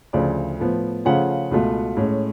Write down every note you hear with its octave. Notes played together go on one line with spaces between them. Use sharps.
D2 C#3 F3 D5
A2 F3 B3
C#3 F3 A3 C#4 F4 F#5
C#2 B2 A3 F4
A2 G#3 C#4